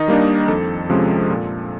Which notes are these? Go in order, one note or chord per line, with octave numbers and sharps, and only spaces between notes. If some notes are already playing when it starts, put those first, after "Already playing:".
Already playing: D#3 D#4 D#5
G3 A#3 D4
F2 A4
C3 F3 G#3 C#4
A#2